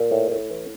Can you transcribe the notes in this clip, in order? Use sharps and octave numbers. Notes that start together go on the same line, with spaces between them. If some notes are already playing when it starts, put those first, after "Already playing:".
Already playing: A#2
A2
A2
E3